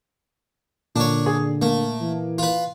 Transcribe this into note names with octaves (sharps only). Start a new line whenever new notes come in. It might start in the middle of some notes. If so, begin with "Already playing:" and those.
A#2 D3 D4 C#5
G#4
A3 A#3
E3
F4 B4